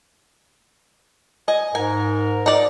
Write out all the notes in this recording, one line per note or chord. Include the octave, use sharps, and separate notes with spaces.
D#5 G#5
G#2 A#4 G#5
D#4 D5